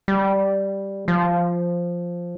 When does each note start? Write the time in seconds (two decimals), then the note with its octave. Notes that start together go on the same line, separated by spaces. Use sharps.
0.08 G3
1.08 F3